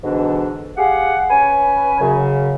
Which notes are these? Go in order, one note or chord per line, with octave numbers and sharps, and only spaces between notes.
G#2 B2 D3 E3 D4
G4 G#4 F5 F#5
C#4 B4 G#5
F#2 C#3